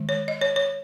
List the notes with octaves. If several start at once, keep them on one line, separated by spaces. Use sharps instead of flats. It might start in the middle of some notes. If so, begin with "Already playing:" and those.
Already playing: D#3 G#3
C#5
D#5
C#5
C#5